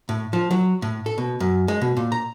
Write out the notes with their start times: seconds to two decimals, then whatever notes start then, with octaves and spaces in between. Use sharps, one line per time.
0.09 A2
0.33 F3
0.51 F#3
0.82 A2
1.06 A4
1.18 B2
1.40 F#2
1.68 G#3
1.81 B2
1.97 A#2
2.12 A#5